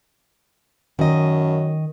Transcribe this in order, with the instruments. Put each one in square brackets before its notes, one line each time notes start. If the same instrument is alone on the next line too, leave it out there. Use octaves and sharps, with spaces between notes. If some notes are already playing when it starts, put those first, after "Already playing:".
[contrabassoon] F#2 [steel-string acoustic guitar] D#3 D#5